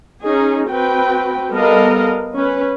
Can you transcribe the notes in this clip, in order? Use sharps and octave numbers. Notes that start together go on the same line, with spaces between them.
C#4 D#4 G#4
C4 F#4 B4 G5
G3 B3 A4 A#4 D#5 F5
C#4 B4